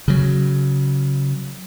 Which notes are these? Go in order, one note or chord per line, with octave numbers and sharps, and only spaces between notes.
C#3 F#3